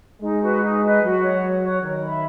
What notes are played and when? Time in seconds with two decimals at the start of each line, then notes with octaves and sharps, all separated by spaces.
0.21 G#3 D#4
0.41 F#4 B4 D#5
0.61 D#4
0.82 F#4 B4 D#5
1.02 F#3 F#4
1.22 C#5 F#5
1.42 F#4
1.63 C#5 F#5
1.83 D#3 A#4
2.02 E5 B5